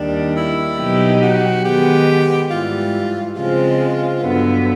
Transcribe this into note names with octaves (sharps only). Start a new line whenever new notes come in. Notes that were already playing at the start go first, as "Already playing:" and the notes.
Already playing: D#2 D#3 G3 D4
E4
B2 F#3 B3 D#4 G4
F#4
D#3 G#3 B3 G4
G#2 E3 G3 F4
C#3 F3 G#3 C4 F4
G2 D3 F#3 B3